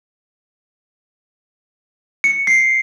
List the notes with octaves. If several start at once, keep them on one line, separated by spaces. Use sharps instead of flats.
C#7
C7